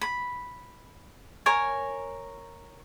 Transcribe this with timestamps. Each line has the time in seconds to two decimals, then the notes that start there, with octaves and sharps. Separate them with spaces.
0.01 B5
1.46 A#4 C#5 G#5